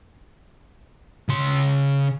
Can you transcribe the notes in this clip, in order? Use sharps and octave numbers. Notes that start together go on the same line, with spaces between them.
C#3 C6